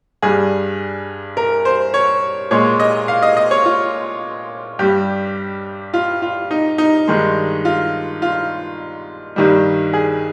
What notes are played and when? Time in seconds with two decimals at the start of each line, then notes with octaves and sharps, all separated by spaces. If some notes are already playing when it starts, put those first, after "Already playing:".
0.22 G2 G3 G#4
1.37 A#4
1.65 C5
1.94 C#5
2.51 A#2 G#3 C#5
2.80 D#5
3.08 F5
3.22 D#5
3.37 D#5
3.51 C#5
3.65 F4
4.79 G2 G3 G4
5.94 F4
6.22 F4
6.51 D#4
6.78 D#4
7.08 G2 D#3 G#3
7.65 F4
8.22 F4
9.36 G2 D#3 G3
9.93 G#4